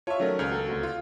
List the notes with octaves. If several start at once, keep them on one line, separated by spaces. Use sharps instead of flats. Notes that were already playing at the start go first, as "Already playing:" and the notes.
F4 C#5 E5 A5 C#6
D#3 F#3 A3 C#4 A#4 D5
C#2 G#4 C5 A#5 F6
F#3 A#3 D4 A4
D2 C4 F#4
F4